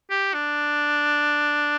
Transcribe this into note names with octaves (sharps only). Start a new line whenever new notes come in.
G4
D4